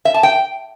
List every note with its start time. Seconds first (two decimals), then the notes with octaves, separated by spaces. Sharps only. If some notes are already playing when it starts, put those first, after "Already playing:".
0.05 E5
0.14 A5
0.23 G5